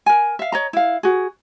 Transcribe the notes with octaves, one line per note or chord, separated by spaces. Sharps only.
A#4 G#5
E5 F5
C#5 D#5 A#5
E4 F5
F#4 G#4